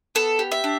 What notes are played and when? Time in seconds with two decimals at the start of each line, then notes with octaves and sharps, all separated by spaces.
0.15 B3 A4
0.39 G4
0.51 E5
0.64 D4